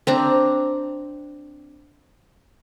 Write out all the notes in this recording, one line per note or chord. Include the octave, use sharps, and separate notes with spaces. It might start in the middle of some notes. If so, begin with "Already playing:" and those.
C4 D4 A#5